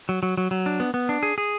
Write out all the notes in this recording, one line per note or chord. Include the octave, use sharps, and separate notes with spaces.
F#3
F#3
F#3
F#3
D4
B3
B3
D4
G#4
G#4